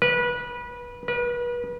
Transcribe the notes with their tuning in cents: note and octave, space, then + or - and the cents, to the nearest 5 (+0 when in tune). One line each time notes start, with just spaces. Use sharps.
B4 -25
B4 -35